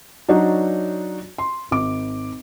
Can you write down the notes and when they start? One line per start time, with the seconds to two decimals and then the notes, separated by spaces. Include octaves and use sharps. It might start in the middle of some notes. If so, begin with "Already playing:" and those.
0.29 F#3 D4 D#4 F#4 C#5 D5
1.38 C6
1.71 G#1 D6